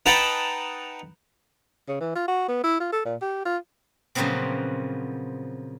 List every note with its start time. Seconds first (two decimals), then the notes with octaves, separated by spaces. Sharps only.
0.06 D#4 B4 F#5 G5 A5
1.88 C#3
2.00 E3
2.15 F4
2.28 F#4
2.48 B3
2.64 E4
2.80 F4
2.92 A4
3.05 A#2
3.22 G4
3.45 F4
4.15 A#2 C#3 F3 F#3 B3 C4